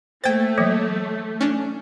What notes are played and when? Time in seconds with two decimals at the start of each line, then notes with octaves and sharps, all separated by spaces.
0.24 A3 A#3 C5 G5 A6
0.58 E3 F#3 A#3
1.41 C#4 D4